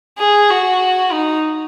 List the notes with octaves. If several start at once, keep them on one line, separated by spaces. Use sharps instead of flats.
G#4
F#4
D#4